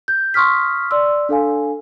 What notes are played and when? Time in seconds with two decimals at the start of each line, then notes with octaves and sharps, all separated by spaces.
0.08 G6
0.34 C6 C#6 D#6 F6 B6
0.91 D5 C6 E6
1.29 D4 A4 F5 G#5